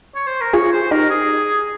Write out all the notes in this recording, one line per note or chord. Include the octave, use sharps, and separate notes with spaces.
C#5
C5
A#4
F4 G#4 C#5
C5
D#4 G4 A#4
G#4